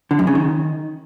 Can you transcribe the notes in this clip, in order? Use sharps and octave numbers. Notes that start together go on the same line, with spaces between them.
D3
F#2
C#3
D#3